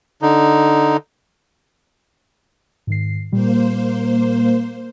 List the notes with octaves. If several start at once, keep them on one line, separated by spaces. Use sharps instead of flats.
D3 D#4
G#2 D#3 C7
A#2 G3 A#3 C5